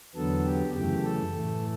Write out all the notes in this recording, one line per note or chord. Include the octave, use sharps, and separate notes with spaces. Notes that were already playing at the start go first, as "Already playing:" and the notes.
E2 D3 F#3 B3 A4
G4
F#2 C#3 E3 A3 G4
A4
A2 E3 A3